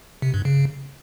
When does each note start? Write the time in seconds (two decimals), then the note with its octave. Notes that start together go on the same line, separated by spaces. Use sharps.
0.22 C3
0.34 G2
0.45 C#3